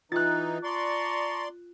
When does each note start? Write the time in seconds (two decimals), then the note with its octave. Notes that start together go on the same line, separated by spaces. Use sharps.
0.12 E3 D#4 F4 F#6 A6
0.64 D5 A5 A#5 C6 C#6